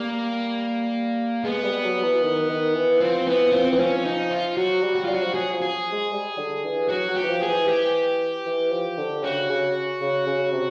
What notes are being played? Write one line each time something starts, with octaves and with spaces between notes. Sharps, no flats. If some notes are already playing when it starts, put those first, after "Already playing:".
Already playing: G3 A#3
G#3 B3
G3
F#3
E3
D#3
D#3
E3
F3 C4
E3 B3
F3 C4
E3
F3 C#4
D#4
F4
F#3 F#4
G3
F#4
F4
F#3
F#4
F3
F#3 G#4
F3
G#4
G#3
G3
D3
E3
F#3 F#4
F#3
G4
E3
F3
G#4
E3
G4
E3
F3
D3
C#3 F#4
C#3
C#3
C#3
C3